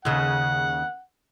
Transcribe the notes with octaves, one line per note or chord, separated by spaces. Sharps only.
D#2 C#3 F#5